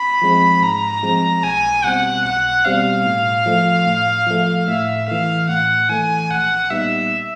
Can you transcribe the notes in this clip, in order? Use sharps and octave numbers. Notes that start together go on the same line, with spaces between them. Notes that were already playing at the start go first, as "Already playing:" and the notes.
Already playing: B5
F3 G#3 C4
G#2 A#5
F3 G#3 C4
B1 G#5
B2 G3 C4 F#5
B1 F#5
B2 G3 C4 F5
A2
F3 A3
A2
F3 A3
A2 E5
E3 A3 F5
A2 F#5
E3 A3 G#5
A#1 F#5
A#2 G3 B3 D#4 E5